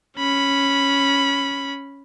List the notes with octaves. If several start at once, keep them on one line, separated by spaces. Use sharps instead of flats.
C#4 B5